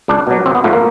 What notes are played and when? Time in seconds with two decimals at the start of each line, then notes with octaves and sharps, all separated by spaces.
0.08 C#2 D4
0.27 B2 F#3
0.46 G#1 C4
0.55 B3
0.64 G#2 F3 A3
0.73 A#3